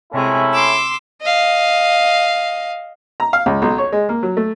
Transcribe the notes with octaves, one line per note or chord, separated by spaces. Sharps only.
C3 G#3 A3 C#4 E4
C6 D6 E6
D#5 F5
A#5
F5
C#2
B1
C#5
G#3
A#3
F#3
A3